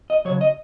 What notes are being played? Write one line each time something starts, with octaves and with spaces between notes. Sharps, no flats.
D#5
C#3 F#3 C#5
D#5